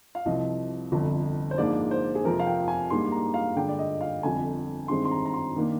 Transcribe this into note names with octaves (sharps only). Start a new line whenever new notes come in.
F5
C2 C3 F3 D#5
G1 F2 D3
C5
G#2 F3 A#3 D4 D5
C5
G#4
F2 C3 F3 C4 A#4
F5
G5
G#5
G#2 G3 A#3 D4 C6
A#5
F5
G2 D3 G#3 D4 G5
D5
D#5
F5
G1 F2 D3 G#5
G2 D#3 G#3 C4 C6
C6
A#5
A#5
C6
D#3 A#3 D4